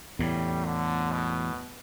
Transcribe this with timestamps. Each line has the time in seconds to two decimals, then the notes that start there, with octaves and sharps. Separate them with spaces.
0.19 E2 A2 G3
0.65 D3
1.12 B2